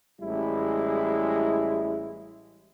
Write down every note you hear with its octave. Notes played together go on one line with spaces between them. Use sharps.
A1 G3 G#3 E4